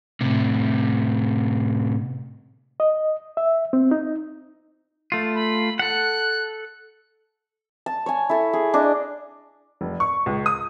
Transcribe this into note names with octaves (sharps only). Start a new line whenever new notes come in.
A2 C3
D#5
E5
C4
D#4
A3 F4
B5
A4 F#5 F#6
A5
C#5 G#5
E4 A4
G#4
D4 D#5
F1
C#6
C#2
D#6